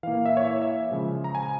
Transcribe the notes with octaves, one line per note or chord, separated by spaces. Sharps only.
E3 A#3 F5
F5
E5
C#5
E5
E5
C#3 F3 G#3
A#5
G#5